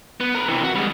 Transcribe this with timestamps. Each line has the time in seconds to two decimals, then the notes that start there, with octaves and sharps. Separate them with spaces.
0.20 B3
0.35 A#4 B4
0.48 C3 E3
0.64 F#4
0.75 G3 G#3